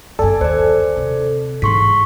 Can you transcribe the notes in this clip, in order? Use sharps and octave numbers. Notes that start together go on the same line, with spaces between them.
F#1 G2 A4 D5 G#5
D#2 C5 D5
C3
G#2 E3 C6 C#6 B6